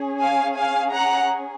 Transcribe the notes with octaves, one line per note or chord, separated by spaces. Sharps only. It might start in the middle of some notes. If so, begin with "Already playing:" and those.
Already playing: C#4 G#4
F5 G#5
F5 G#5
F#5 A#5